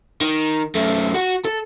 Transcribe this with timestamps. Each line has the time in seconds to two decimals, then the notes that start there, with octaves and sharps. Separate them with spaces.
0.21 D#3
0.75 F#2 A3
1.14 F#4 F#5
1.45 A4